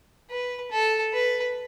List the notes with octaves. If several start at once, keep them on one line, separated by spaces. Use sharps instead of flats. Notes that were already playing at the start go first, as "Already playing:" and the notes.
B4
A4
B4